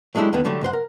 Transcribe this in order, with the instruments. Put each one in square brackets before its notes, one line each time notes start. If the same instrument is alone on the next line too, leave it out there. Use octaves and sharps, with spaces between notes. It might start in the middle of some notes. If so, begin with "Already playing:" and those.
[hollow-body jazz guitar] F#3 G#3 A3 D4 E4 G4
D#2 D3 D#3 B3
D3 F#3 G3 A3
C2 F#2 C5 F#5
A#4